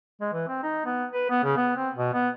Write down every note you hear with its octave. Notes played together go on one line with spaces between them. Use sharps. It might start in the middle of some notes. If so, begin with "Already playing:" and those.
G#3
E3
C4
D#4
B3
B4
B3
C#3
B3
C4
B2
B3